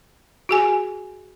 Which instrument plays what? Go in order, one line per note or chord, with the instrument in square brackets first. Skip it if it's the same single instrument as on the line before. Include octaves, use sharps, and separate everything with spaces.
[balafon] F#4 G#4 G#5